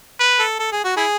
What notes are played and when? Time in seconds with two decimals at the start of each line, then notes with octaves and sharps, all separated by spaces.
0.19 B4
0.39 A4
0.59 A4
0.72 G#4
0.84 F#4
0.96 E4 G#4